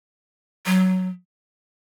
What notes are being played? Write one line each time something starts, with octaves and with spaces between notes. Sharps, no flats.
F#3